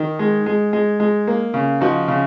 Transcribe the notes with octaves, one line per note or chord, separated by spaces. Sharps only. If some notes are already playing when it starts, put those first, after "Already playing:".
Already playing: D#3 D#4
G#3
G#3
G#3
G#3
A#3
C#3
F3 D#4 F#4
C#3